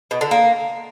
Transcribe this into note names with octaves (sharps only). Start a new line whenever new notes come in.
B2
D3
A#3